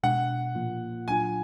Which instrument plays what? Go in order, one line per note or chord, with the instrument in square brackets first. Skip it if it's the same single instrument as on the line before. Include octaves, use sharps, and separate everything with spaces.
[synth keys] B2 G#3 D4 [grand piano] F#5
[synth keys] A#2 F3 A#3 F4
[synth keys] A#2 F#3 D4 F4 [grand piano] G#5